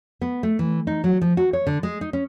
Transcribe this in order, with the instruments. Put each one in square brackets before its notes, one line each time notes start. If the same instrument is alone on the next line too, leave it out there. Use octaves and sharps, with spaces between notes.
[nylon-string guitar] B3
A3
E3
D#4
F#3
F3
F#4
C#5
D3
G#3
D#4
C#4